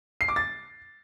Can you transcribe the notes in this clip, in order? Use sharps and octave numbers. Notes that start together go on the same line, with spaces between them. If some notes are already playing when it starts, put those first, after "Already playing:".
C7
D6
A6